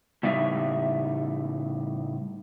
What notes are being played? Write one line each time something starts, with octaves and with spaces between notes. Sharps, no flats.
A2 C#3 G3 D#4 E5